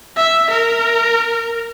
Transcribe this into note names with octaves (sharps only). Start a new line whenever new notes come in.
E5
A#4